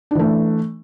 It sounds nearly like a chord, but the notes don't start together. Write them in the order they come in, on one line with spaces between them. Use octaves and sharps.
D4 E3 A3